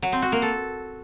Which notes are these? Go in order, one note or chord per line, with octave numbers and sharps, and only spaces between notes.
F#3
C4
F#4
A#3
A4